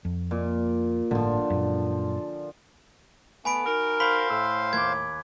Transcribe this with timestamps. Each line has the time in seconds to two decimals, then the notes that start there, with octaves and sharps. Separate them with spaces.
0.05 F2
0.31 A#2
1.11 G1 A2 D3 F3 A#3
1.50 F#2 A#2
3.45 A3 B3 G#5 B5 D7
3.66 D#4 F#4 A#4
4.00 C5 F5 B5 C6 B6 G7
4.30 A2 E6
4.73 D#2 D6 G#6